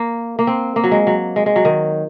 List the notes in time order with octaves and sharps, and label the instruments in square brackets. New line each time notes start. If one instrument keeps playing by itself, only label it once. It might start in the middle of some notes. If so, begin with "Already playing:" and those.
Already playing: [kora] A#3
A#3
C4
A#3
F#3
G#3
F#3
G#3
G#3
F#3
D#3